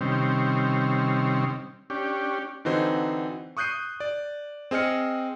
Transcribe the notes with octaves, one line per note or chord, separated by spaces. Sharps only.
C3 D#3 G3 C4 C#4
C#4 D4 G4
D3 E3 C4 D#4 F#4 C5
C#6 D#6 F#6 G6 C7 D#7
D5
C4 G#4 D#5 F6 C#7